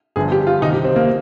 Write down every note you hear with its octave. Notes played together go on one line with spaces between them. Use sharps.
G1 G2 D3 F3 G#4
G4
F4
C2 C3 D#3 D#4
G4
C4
A#3